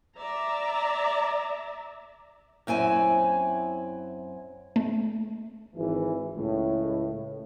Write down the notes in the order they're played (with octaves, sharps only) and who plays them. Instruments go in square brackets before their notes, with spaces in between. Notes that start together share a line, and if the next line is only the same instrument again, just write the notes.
[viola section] D5 E5 A#5
[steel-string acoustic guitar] F#2 C4 E4 G#5
[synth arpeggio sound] A3
[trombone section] G#1 E3
C#2 A2